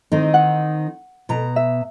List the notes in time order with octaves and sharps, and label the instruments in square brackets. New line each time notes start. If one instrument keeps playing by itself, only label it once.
[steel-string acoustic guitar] D#3 C4 D#4
[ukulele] F#5
[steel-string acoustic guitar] B2 A#5
[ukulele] E5